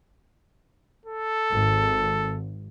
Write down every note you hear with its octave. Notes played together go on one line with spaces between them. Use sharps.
A4
G#1